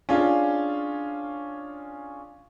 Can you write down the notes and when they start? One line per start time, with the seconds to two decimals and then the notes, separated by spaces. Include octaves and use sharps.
0.09 C#4 D4 F4 G#4 F5